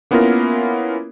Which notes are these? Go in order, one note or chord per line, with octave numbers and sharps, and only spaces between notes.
A#3 B3 C#4 E4 F4 A#4